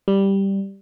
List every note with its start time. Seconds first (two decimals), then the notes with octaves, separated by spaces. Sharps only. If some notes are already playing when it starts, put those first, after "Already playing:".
0.08 G3